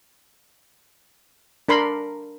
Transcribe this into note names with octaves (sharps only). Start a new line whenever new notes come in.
D4 A#4 B5 C6